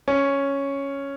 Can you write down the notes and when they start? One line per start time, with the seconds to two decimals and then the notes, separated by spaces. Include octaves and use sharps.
0.08 C#4